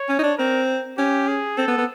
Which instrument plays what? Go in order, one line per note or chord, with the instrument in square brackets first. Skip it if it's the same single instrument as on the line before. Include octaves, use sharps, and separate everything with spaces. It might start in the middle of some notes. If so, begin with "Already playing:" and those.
Already playing: [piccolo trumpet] C#5
[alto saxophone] C#4
D#4
D4
[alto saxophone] C4 [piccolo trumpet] A#4
[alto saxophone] C#4 [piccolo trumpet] G4
[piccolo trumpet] G#4
[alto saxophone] C4 [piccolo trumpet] A4
[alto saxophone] B3
B3